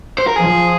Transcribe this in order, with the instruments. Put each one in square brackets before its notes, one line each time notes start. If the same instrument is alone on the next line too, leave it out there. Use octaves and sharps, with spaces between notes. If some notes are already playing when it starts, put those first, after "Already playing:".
[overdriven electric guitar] C5
A#4
[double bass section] F3 [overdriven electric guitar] G#4